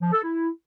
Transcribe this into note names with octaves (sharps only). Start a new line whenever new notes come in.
F3
A4
E4